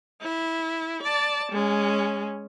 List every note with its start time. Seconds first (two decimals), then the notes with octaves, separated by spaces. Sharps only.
0.22 E4
1.03 D5 A5
1.52 G#3 C#4